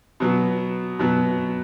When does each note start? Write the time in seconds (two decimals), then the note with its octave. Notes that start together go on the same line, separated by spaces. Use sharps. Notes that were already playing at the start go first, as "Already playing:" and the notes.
0.20 B2 F#3 B3
0.99 B2 F#3 B3